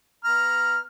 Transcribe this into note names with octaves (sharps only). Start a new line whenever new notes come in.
B3 A#5 F6